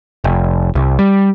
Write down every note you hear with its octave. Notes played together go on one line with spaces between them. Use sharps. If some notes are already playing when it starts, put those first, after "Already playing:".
F1
C2
G3